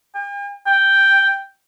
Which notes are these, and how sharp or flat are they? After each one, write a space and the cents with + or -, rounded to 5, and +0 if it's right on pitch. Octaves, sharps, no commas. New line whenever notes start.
G5 +45
G5 +0